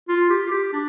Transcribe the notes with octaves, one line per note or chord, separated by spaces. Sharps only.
F4
G4
F4
G4
D4